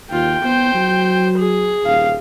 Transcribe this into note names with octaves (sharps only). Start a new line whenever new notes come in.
D#2 F4 G5
B3 C5
F#3
G#4
D#1 F5